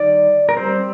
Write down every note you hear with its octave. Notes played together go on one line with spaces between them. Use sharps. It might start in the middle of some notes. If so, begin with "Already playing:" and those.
Already playing: D#3 G3 D5
A#4
G3 C4 C5